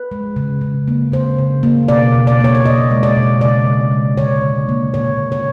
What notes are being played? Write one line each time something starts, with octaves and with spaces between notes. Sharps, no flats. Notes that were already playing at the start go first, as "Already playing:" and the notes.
Already playing: B4
G#3
C#3
C#3
A#3
C#3 C5
C#3
A#3
B2 D5
B2
D5
A#3 C#5
D5
B2 D#5
G#3
D5
B2
C#3 D5
C#3
G#3
D3 C#5
D3
A#3
A#2 C#5
A#2
C#5